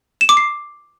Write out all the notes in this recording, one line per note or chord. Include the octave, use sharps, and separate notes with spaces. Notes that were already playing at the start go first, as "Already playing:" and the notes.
E7
D6
C7